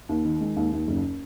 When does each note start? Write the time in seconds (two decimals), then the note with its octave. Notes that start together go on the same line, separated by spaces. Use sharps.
0.09 D#2
0.25 D#3
0.41 G#3
0.56 D#2
0.72 D#2
0.87 F#1